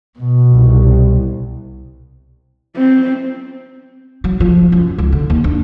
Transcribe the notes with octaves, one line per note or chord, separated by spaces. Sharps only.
B2
C2
C4
F#3
F3
F#2
C#2
D3
D#2
D4